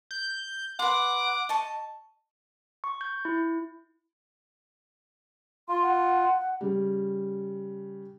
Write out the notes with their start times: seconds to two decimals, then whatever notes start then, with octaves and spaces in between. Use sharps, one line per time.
0.11 G6
0.79 B4 F#5 C6 D6
1.49 D#5 A5 C#6
2.84 C#6
3.01 G6
3.25 E4
5.69 F4 C6
5.82 F#5
6.61 C#3 G3